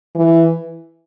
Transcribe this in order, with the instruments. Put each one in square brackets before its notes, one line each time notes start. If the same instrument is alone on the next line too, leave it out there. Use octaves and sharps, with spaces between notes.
[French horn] E3